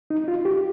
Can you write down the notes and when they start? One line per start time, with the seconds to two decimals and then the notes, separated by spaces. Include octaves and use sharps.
0.10 D#4
0.28 F4
0.45 G4